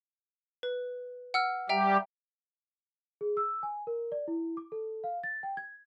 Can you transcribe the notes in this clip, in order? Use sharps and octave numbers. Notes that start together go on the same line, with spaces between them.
B4
F#5 E6 F6
G3 G4 E5 G5 A#5
G#4
E6
G#5
A#4
D5
E4
D6
A4
F5
A6
G5
G#6